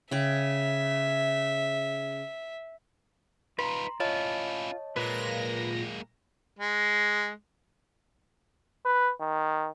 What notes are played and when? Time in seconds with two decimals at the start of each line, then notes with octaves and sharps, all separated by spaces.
0.11 C#3 E5 G5
3.59 D#4 F4 B4 A#5 C6
4.00 C#4 E4 F4 C#5 D#5 A5
4.96 A#2 G#3 A#3 B4 A#6
6.59 G#3
8.86 B4
9.20 D#3